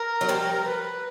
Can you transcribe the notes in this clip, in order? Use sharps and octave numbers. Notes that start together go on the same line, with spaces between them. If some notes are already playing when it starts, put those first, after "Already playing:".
Already playing: A#4
F#3
F3 G3
B4